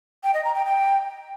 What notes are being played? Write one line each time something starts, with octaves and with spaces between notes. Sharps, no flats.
G5
D#5
A#5
G5
G5